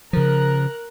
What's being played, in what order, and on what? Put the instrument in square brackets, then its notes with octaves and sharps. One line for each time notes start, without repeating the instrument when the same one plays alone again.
[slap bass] C#3 F3 [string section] A#4 F#6